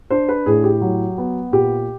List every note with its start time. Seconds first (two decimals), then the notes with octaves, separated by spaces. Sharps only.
0.10 D4 C5
0.29 B4
0.46 A2 G#4
0.64 G4
0.81 F#3
1.18 B3
1.52 A#2 G4